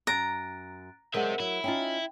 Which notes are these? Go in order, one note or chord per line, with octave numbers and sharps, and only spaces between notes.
F#2 A#5 F#6 A6 D7
F#3 G#3 C4 F#4 A#4 E5 F#5
F#3 E4
C#4 D#4 F4 G5